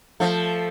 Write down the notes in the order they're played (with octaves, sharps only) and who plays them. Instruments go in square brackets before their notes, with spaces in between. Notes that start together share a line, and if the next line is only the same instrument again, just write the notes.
[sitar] F3 A3